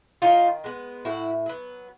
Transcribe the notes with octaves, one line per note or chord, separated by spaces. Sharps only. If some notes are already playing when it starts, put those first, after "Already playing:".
D#3 D#4 F4
G#3 B3
A2 E4 F#4
F#3 B3